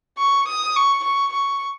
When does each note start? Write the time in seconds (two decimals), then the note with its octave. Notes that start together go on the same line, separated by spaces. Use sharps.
0.18 C#6
0.48 D#6
0.76 C#6
1.04 C#6
1.33 C#6